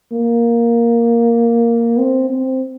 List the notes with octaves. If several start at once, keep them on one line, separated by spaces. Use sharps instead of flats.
A#3
C4
C4